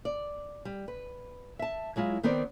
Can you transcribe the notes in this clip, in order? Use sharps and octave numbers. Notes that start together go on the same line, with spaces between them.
D5
G3
B4
E5 A5
F#3 G#3 E4 F4
D#3 B3 C4 A#4 D5